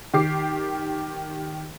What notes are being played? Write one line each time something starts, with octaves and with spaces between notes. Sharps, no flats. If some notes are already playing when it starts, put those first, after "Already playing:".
D#3 G4 D6 C7